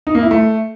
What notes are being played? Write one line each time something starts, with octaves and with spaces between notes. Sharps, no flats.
D#4
A#3
E4
A3